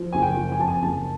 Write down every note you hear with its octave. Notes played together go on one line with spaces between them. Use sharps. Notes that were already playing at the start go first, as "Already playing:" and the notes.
Already playing: F3
F#1 G#5
G5
F3
G#5
F2 A5
G#5
F#1 A5